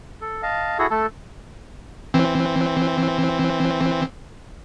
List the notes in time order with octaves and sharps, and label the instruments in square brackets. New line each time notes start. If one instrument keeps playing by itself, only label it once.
[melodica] A4
D#5 F5 A5
E4 F#4 G#4 A4
A3 A4 A5
[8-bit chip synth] E3 C4